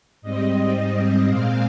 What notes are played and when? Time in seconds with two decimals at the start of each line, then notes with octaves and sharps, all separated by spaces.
0.22 G#2 G3 C4 D#5
1.27 A#2 G#3 C4 F5